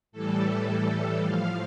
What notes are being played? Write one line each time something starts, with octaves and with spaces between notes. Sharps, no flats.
A2 E3 G3 A4
A2 F3 F5